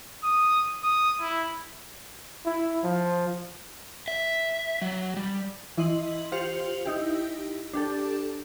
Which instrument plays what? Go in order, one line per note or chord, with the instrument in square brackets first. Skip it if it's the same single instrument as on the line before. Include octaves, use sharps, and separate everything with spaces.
[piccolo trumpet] D#6
D#6
E4
[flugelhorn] E4
F3
[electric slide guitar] E5
F#3
G3
[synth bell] E3 E4 D#5 C6 F#7
F4 G4 C5 C#7 F7 F#7
D#4 E4 G4
D4 G4 A4